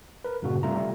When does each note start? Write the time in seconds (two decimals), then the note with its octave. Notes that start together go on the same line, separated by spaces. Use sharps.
0.25 A#4 B4
0.42 G2 A#2 C#3 A#3 F#4
0.63 C3 G3 A3 F4 A#5